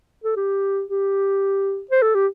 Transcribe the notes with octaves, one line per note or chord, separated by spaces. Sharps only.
A4
G4
G4
C5
A4
G4